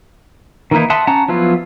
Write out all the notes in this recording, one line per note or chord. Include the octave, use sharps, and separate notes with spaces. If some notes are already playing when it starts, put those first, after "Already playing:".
D#3 E3 A#3 D#4 E4
E5 F#5 A5 C6 D#6
C#4 F#5 A5 A#5
F3 F#3 B3 E4 F4